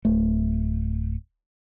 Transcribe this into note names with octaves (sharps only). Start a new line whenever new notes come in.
D1 A3